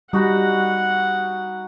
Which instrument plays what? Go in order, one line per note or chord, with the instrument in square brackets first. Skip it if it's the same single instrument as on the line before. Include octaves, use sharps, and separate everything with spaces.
[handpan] G3 [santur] D#4 F#4 B5 [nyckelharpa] F#5